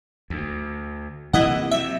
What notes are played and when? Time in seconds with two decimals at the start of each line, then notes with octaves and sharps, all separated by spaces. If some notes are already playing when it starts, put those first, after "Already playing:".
0.30 D2
1.33 C3 E3 A#3 E4 D#5 F#5
1.71 C3 F#3 E5